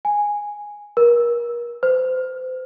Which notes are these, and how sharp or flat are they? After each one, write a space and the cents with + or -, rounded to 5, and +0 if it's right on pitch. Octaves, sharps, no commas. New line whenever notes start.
G#5 -5
A#4 +35
C5 -30